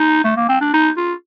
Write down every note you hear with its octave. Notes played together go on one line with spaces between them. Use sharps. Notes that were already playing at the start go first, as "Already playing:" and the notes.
Already playing: D#4
A3
A#3
C4
D4
D#4
F4